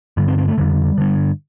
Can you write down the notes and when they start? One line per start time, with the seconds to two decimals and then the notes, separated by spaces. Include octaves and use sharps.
0.17 G2 D3 G3
0.28 C4
0.38 C4
0.48 A3
0.58 F2 D3 G3
0.98 G2 D3